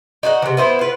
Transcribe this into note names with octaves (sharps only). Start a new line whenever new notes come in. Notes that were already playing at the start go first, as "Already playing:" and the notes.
D#4 F#4 C5 F#5
C3 E3
B3 E4 C5
F4 B4